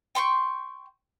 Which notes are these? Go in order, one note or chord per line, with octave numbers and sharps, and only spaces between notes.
G5 C6 C#6 G6